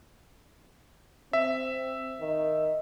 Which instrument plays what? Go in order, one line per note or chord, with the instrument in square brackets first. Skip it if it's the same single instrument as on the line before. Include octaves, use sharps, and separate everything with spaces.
[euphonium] C4 [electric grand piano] E5
[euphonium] D#3